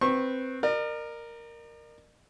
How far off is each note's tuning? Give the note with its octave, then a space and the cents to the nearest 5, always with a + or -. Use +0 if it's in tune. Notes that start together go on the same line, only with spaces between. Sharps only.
C4 +0 B4 +0 C#6 -25
A#4 +0 D5 +45